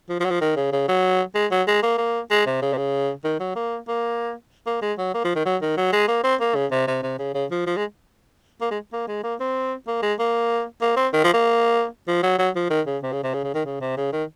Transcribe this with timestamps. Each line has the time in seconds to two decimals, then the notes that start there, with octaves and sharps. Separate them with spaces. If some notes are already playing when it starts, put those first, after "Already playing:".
0.09 F3
0.20 F3
0.25 F#3
0.30 F3
0.41 D#3
0.56 C#3
0.72 C#3
0.88 F#3
1.35 G#3
1.51 F#3
1.67 G#3
1.83 A#3
1.98 A#3
2.31 G#3
2.46 C3
2.62 C#3
2.73 C3
2.78 C#3
3.24 D#3
3.40 F#3
3.56 A#3
3.88 A#3
4.66 A#3
4.82 G#3
4.98 F#3
5.14 A#3
5.24 F3
5.35 D#3
5.45 F#3
5.62 D#3
5.77 F#3
5.92 G#3
6.08 A#3
6.24 C4
6.41 A#3
6.55 C#3
6.71 C3
6.87 C3
7.03 C3
7.19 C#3
7.34 C#3
7.51 F3
7.66 F3
7.77 G#3
8.61 A#3
8.71 G#3
8.93 A#3
9.08 G#3
9.24 A#3
9.40 C4
9.87 A#3
10.02 G#3
10.19 A#3
10.82 A#3
10.97 C4
11.13 D#3
11.24 F3
11.33 A#3
12.08 F3
12.23 F#3
12.39 F#3
12.55 F3
12.70 D#3
12.87 C#3
13.03 C3
13.12 C#3
13.24 C3
13.34 C#3
13.44 C#3
13.54 D#3
13.65 C#3
13.81 C3
13.97 C#3
14.12 D#3